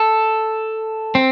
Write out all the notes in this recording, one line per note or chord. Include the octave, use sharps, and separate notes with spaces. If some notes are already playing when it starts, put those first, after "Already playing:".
Already playing: A4
C4